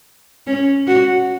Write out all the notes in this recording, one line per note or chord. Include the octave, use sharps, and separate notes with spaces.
C#4
F#4